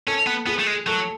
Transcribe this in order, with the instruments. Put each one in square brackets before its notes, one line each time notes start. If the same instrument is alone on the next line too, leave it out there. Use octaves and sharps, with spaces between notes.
[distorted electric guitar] C#4 [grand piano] A4
[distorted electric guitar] B3
[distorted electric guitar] B3 [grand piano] G#4
[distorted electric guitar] A3
G#3
[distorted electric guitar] F#3 [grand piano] A4